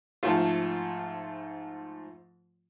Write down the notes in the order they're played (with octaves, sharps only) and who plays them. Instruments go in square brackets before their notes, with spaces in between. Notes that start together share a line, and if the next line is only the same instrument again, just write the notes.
[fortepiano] G#2 F3 A3 F4